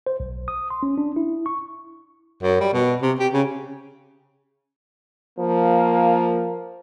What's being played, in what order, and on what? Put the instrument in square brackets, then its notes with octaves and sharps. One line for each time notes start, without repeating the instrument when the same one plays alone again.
[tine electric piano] C5
B1
D#6
C6
C#4
D4
E4
C#6
[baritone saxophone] F#2
G3
B2
C3
G4
C#3
[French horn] F3 [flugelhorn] A#3